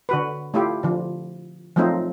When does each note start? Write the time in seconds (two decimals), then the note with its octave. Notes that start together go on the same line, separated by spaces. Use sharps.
0.09 D3 F#4 B4
0.54 A3 E4 F4 G4
0.83 D3 F3
1.76 F3 F#3 A3 C4 D#4 F4